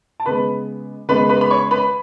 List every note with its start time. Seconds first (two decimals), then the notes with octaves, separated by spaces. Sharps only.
0.20 A5
0.26 C#3 G#3 B3 B4 B5
1.08 C#3 G#3 B3 B4 B5
1.29 B4 B5
1.41 B5
1.51 C#5 C#6
1.71 B4 B5